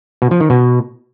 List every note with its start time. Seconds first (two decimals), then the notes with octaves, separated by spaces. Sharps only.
0.22 B2
0.31 F3
0.41 D#3
0.50 B2